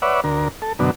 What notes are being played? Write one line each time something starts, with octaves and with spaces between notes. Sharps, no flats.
B4 C#5 D5 E5 F#5
D2 A#4
A4
F#2 B2 D3